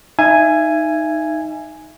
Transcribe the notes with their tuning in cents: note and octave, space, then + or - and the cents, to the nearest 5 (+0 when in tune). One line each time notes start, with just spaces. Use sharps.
D#4 +5 E5 +35 G#5 +0